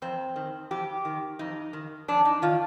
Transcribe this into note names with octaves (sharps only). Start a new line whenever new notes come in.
F2 C4
D#3
F2 G4
D#3
F2 D#4
D#3
F2 D4
D#4
D#3 F4